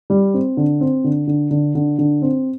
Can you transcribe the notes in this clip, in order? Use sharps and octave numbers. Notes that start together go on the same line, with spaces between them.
G3
C4
D3
C4
D3
D3
D3
D3
D3
C4